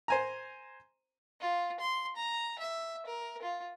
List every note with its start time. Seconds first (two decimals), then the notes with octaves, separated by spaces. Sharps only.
0.08 C5 G#5 A#5
1.41 F4
1.80 C6
2.16 A#5
2.59 E5
3.06 A#4
3.42 F4